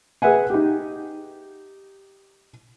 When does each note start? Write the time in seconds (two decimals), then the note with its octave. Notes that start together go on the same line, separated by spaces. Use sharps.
0.22 G#4 B4 E5 F#5 G#5
0.50 D#4 G4